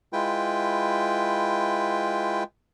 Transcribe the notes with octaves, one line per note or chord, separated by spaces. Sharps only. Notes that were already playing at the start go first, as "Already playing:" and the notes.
G#3 E4 F4 B4 G5